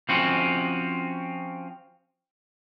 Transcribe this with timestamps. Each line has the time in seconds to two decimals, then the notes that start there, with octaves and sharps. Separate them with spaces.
0.09 F3 C4 C#4 F#4